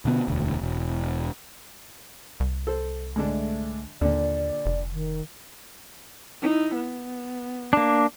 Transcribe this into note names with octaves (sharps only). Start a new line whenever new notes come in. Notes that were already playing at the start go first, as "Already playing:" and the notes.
B2 D3 B3
E1 D2
E1
C2
A4 C5
G#2 D3 A3 D4
D#2 A#2 D3 D5
F1
D#3
D#4 E4
B3
A#3 D4